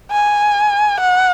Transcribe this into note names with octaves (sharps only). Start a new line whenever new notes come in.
G#5
F#5